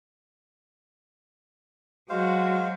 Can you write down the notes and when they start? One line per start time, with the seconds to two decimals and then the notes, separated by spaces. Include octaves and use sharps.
2.10 F#3 G#3 F#4 C5 F5